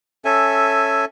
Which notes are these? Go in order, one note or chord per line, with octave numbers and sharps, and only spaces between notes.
C#4 A4 E5 G#5